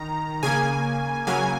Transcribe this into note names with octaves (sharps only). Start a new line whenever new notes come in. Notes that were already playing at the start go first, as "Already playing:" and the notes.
Already playing: D#3 A#5
C#3 A#3 G#5
C#3 F#3 A#3 G#5